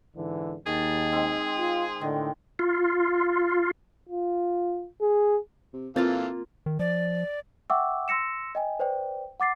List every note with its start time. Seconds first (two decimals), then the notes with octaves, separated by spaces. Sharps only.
0.15 G#2 D3 E3
0.66 D#2 D#3 G#4 A5
1.12 G#3 C4 D#4
1.56 F4
2.01 A2 D3 D#3
2.59 F4
4.09 F4
5.01 G#4
5.73 C3
5.96 A#2 E3 A#3 C4 F4 A4 F5 A6
6.66 D#3
6.79 F3 D5
7.70 E5 F#5 G5 C#6 D6 E6
8.08 C6 E6 A#6 C#7 E7
8.55 D#5 G5 G#5
8.79 B4 C5 D5 G5
9.40 F#5 D6 A6 C7